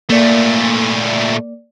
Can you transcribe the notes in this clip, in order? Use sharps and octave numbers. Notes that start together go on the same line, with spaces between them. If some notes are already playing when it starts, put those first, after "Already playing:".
A#2 A3 A#3 D5